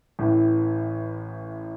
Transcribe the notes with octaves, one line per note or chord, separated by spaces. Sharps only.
A1 A2 E3